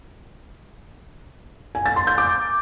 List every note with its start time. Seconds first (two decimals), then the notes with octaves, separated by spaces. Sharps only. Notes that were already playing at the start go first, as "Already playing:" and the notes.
1.75 G#5
1.86 A6
1.96 C6
2.07 G6
2.18 D6